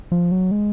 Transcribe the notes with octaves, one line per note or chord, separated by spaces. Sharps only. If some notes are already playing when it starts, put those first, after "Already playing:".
F3
F#3
G#3